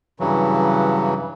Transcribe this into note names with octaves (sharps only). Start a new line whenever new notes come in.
G2 C#3 E3 F#3